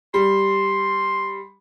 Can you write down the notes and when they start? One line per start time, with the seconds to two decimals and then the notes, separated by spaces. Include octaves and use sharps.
0.14 G3 C6